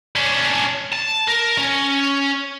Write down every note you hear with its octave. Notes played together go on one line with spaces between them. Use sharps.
C#4 D4
A5
A#4
C#4